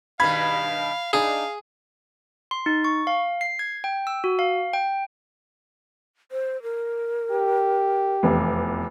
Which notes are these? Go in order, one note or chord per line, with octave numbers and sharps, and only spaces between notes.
G2 B2 D#3 F5 B5 G#6
D4 D#4 G#4 F5
C6
D#4
C#6
F5
C7
G#6
G5
E6
F#4
F5
G5
C5
A#4
G4
F1 E2